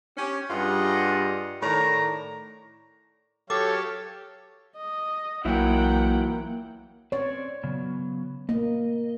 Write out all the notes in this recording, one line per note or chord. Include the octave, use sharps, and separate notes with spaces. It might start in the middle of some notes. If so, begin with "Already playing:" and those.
C#4 G4
G2 G3 F4 G#4 D#5 F#5
A2 D#3 C#5 D5 A#5
F#3 G4 A4 C#5 F5 D6
D#5
B1 E3 F#3 A#3 E4 F#5 G5
C4 C#5 D5
C#3 F#3 B3
A#3 D#5